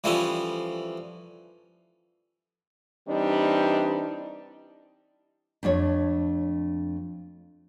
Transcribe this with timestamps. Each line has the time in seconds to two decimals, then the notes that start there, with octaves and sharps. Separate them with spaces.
0.04 E3 F3 G3 C#4 A4
3.07 E3 G3 C4 D4 D#4
5.63 F2 A3 D4 C#5